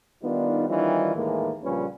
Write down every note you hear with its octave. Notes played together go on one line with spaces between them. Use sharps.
D#3 G3 B3 D4 D#4 F4
D#3 E3 G3 C#4 D#4 F4
D#2 A2 E3 G#3 A#3
A#1 C#3 G3 C#4 F4 B4